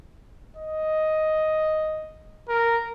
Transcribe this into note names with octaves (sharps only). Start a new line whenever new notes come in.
D#5
A#4